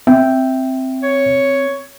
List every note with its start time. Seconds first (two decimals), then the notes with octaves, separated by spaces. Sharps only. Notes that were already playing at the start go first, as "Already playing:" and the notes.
0.07 C4 E5 G5
1.03 C#5